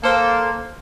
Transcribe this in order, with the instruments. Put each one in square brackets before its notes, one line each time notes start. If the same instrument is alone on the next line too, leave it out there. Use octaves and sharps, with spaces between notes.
[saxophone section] A#3 [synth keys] A4 C5